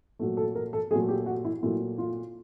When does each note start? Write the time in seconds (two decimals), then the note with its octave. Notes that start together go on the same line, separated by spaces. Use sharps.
0.19 A#2 F#3 A3
0.37 A4
0.55 A#4
0.73 A4
0.91 A#2 F#3 A3 G#4
1.09 G4
1.26 F#4
1.45 E4
1.62 A#2 F#3 A3 E4
1.98 F4